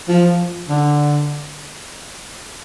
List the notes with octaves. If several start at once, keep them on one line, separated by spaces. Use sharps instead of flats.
F3
D3